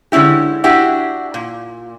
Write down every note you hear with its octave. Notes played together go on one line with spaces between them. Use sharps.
D3 G#3 C#4 E4 G4
D4 E4 F#4 G4
A#2